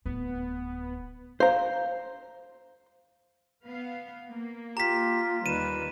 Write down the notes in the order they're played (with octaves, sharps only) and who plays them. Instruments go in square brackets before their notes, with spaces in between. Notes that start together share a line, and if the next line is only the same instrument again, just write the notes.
[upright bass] D1 [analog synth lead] B3
[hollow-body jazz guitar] C5 A#5 [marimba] F5
[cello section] B3 F5
A#3
[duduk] F4 [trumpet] G4 [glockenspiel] A#5 B6
[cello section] D#2 D#3 G3 [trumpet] B4 [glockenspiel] D#7 E7